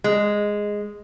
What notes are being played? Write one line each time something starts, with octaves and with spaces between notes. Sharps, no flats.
G#3